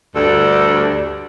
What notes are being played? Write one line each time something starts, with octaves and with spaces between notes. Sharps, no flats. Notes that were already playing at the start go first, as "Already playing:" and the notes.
D2 G2 D4 A4